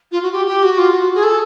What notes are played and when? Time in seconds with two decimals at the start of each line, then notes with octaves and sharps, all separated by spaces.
0.12 F4
0.22 F#4
0.32 G4
0.47 G4
0.63 F#4
0.78 F4
0.93 F#4
1.15 G#4
1.24 A4